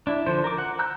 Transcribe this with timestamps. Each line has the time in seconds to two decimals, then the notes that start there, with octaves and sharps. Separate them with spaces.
0.07 D4 E4
0.26 D3 F3 C5
0.44 A#4 D6
0.58 F#5
0.79 A#5 E6 F#6 G6